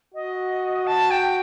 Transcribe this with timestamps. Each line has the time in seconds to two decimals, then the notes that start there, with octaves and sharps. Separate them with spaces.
0.14 F#4 D#5
0.87 A5
1.11 G5